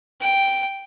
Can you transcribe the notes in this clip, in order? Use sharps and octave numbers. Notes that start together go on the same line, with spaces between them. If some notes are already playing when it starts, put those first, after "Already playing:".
G5